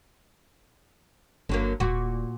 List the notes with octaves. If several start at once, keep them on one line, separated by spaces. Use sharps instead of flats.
G1 D3 F#3 A#3
D#1 A#2 F#4